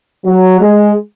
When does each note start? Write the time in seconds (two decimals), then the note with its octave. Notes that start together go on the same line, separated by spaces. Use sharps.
0.25 F#3
0.60 G#3